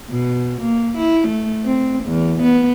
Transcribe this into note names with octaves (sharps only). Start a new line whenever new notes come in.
B2
A#3
E4
A3
C4
E2
B3